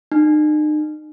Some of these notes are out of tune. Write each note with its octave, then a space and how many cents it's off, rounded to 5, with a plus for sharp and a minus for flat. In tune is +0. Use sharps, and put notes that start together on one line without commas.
D#4 -40